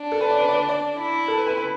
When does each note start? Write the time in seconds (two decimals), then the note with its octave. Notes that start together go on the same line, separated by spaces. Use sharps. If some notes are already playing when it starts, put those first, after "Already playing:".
Already playing: D4
0.12 A4
0.21 B4
0.31 D5
0.40 B4
0.49 D5
0.55 B4
0.69 D5
0.98 E4
1.28 A4
1.37 B4
1.47 B4
1.57 B4